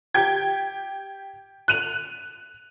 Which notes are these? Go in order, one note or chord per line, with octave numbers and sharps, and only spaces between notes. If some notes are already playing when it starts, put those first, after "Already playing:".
G4 G5 G#6
F#6 D#7 F7